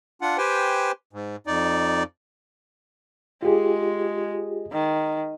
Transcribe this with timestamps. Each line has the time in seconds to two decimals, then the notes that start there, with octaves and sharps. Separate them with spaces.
0.21 D4 F4 F#5
0.38 G4 B4 C5 G5 G#5
1.13 G#2
1.47 F2 D#4 D5
3.43 G#3 F4 G4 G#4
4.72 D#3